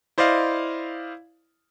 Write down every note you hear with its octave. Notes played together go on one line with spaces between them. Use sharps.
E4 C5 D5 D#5 F5